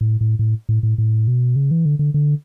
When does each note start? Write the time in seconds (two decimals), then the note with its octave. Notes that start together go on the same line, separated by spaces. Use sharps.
0.01 A2
0.21 A2
0.39 A2
0.69 A2
0.83 A2
0.98 A2
1.27 B2
1.56 C#3
1.71 E3
1.85 D3
1.99 D3
2.14 D3